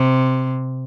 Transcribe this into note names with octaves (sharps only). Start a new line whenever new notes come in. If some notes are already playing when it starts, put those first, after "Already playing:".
Already playing: C3